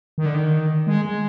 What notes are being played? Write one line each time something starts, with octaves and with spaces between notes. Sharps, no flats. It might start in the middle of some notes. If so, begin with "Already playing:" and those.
D#3
D3
D#3
G#3
G#3